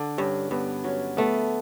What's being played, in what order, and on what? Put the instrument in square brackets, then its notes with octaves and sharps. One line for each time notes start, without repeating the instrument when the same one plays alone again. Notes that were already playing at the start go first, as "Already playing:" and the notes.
Already playing: [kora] D3 [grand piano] D4
[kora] G2 [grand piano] C#4
[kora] G2 [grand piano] B3
[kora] F#3 [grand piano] C#4
[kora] A3 [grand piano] B3